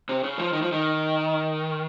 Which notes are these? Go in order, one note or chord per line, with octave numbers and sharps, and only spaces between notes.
C3
C#3
F3
D#3
F3
D#3